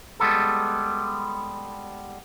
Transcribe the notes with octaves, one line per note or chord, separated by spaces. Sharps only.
G3 G#3 B3 A4